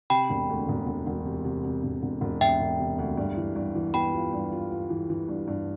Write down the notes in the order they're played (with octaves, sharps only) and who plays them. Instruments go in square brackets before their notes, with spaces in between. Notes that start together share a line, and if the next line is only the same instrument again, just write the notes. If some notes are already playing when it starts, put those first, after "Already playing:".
[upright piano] C3 [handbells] G5 B5
[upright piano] E1
D2
E1
E1
E1
C3
C3
C3
E1
E1
E1
[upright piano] E1 [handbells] E5 G5
[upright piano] E1
C3
D2
G2
E3
G2
E3
[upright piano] B3 [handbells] G5 B5
[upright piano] F4
G2
F4
F4
E3
E3
G2
G2